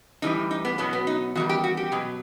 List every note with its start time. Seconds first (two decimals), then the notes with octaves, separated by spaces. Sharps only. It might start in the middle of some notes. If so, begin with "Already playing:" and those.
0.22 A2 E3 G3 D#4
0.51 D#4
0.65 B3
0.78 B2 F#3 B3
0.93 B3
1.07 D#4
1.35 E2 D#3 G3 F#4
1.49 G4
1.64 F#4
1.77 G4
1.92 B2 F#3